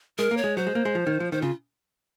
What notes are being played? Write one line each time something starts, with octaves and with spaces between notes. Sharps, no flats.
G#3 A#4
A#3
C#5
G#3
F#3 C5
G#3
A#3
G#3
F3
D#3
F3
D#3 C5
C#3 F4